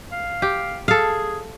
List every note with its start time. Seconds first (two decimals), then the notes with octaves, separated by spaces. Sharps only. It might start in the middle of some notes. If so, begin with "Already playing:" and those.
0.12 F5
0.42 G4
0.88 G#4 A4 F5